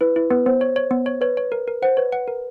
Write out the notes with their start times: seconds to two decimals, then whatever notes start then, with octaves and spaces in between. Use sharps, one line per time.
0.01 E4 B4
0.16 E4
0.30 B3 B4
0.46 B3 C5
0.61 C#5
0.76 C#5
0.91 B3
1.06 C#5
1.21 B4 C#5
1.37 C#5
1.52 A#4
1.67 A#4
1.82 C5 F#5
1.97 B4 C#5
2.12 F#5
2.28 A#4